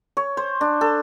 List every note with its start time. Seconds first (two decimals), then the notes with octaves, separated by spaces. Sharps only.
0.17 C#5
0.37 C5
0.61 D4
0.81 A4